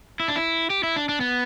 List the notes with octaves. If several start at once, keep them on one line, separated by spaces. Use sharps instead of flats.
E4
D4
E4
G4
E4
D4
D4
B3